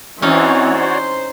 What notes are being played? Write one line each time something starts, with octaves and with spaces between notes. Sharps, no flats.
E3 C4 C#4 D#4 F#4 C#5 D5
C5